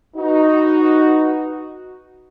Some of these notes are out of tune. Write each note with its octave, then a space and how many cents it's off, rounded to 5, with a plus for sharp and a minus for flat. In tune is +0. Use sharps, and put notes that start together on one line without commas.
D#4 +0 F#4 +0 B4 +0